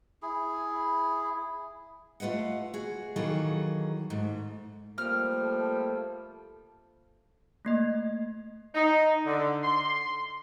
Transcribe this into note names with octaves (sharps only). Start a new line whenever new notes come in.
E4 G#4
A3 F4 B4 D#5 F#5
F#4 G#4
D#3 E3 F#3 A#3 G#4 A4
G#2 A3
F3 G3 A3 A#3 F6
A4
A3 A#3 D#5
D#4
D3
C6